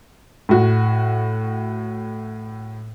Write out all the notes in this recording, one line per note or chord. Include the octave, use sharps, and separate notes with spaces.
A2 F#4